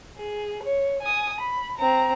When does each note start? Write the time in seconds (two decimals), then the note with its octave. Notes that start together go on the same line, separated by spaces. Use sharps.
0.18 G#4
0.63 C#5
1.02 G#5 D#6
1.40 B5
1.77 C4 A#5